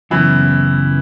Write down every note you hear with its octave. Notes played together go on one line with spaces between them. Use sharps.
F#2 C#3 E3 F#3 B3 E4